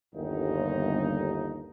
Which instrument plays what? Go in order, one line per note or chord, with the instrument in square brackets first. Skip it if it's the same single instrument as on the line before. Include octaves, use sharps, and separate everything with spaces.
[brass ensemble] G1 D#2 D#4